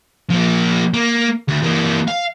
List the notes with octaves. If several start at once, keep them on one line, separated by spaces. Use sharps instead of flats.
F3 A#3
A#3
D2
E3 A#3
F5